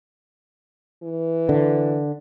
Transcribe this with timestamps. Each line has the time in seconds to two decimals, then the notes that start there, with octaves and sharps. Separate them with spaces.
1.03 E3
1.49 D3